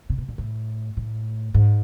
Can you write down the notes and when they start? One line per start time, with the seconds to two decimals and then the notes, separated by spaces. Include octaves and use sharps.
0.10 C3
0.18 B2
0.28 A#2
0.38 A2
0.97 A2
1.54 G#2